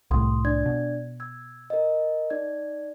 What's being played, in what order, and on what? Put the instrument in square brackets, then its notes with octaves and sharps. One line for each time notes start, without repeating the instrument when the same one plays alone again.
[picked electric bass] C2 A2 [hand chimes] C6 D#6
[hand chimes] D4 D5 G#6
[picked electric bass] B2
[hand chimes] E6 G#6
A#4 D#5
D#4 D5 G#6